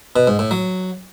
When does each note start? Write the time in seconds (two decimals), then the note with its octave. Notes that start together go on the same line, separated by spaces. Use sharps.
0.16 B2
0.27 G#2
0.39 A2
0.51 F#3